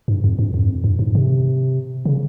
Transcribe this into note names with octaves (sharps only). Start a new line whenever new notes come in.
G2
F2
G2
F2
G2
G#2
C3
C#3